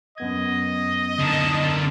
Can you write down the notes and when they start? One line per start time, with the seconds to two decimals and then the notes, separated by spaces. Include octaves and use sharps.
0.18 F#2 B3 D#5 G#6
1.20 D3 A#4 A5